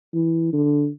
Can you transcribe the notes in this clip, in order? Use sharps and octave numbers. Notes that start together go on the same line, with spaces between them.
E3
D3